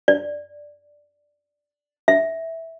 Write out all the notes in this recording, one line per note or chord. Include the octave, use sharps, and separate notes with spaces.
D5
E5